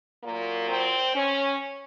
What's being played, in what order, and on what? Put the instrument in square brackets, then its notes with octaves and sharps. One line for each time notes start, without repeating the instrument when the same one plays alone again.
[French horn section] A#2 F#3 A#3
C4
C#4